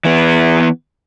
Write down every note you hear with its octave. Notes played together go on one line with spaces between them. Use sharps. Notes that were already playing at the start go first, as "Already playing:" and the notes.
E3 B3